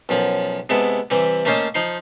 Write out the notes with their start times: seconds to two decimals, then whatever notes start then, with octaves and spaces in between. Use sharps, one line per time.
0.09 B1 F#2 F3
0.69 C3 G#3 B3 E4 A4
1.10 C3 E3 G3
1.45 A3 A#3 C#4 C5 D#5 A5
1.74 F3 D#4 C6